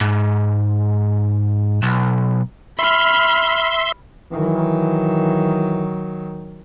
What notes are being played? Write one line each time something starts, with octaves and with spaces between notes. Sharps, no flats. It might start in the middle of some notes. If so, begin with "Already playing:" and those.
G#2
B1
E5 B5 C6 F6
D#3 E3 F#3